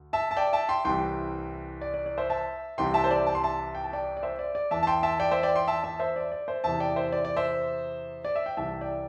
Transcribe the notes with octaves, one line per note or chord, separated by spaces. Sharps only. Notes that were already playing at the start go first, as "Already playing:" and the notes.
Already playing: D2
E5 A5
A5
D5 G5
E5 A5
G5 C6
C2 C3 E3 G5 C6
D5
D5
D5
C5 E5
E5 A5
C2 C3 E3 G5 C6
E5 A5
C5
D5
A5
C6
E5 A5
G5
A5
D5 G5
D5
C5 E5
D5
D5
E2 E3 E5 A5
A5
G5 C6
E5 A5
D5 G5
C5 E5
D5 G5
G5 C6
E5 A5
E5 A5
C5 E5
D5
D5
C5 E5
E2 C3 E3 E5 A5
D5 G5
C5 E5
D5
D5
C5 E5
D5
E5
G5
C2 C3 E3 E5 A5
D5 G5